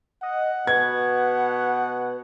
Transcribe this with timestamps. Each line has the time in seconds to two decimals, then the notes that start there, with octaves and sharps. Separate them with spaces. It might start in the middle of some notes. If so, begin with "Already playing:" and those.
0.23 D#5 F#5
0.67 B2 B4 G#6